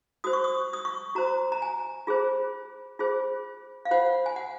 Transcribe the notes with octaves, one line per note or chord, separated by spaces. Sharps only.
F#4 C5 D#6
C#6
D#6
D#6
D#6
C#6
F#4 C5 A#5
A#5
G#5
F4 G#4 C5
F4 G#4 C5
F5
F4 C5 F#5
G#5
F#5